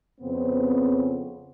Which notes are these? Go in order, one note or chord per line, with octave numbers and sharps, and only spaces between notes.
F2 C#3 B3 C4